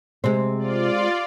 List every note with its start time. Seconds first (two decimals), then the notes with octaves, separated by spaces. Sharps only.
0.24 C3 G#3 C4
0.58 F4 D5